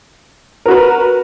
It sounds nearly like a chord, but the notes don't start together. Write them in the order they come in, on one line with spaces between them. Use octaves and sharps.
A#4 F#4 B4